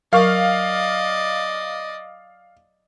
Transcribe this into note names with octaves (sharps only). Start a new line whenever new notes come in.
F#3 A#4 D5 D#5 F5 C#6